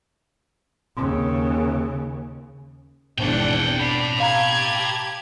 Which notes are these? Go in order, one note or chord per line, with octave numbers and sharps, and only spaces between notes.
D#2 C#3
G#1 E2 B2 C4 D4 F#5 G5
D4 A5 B5
G4 F5 A#5 G#6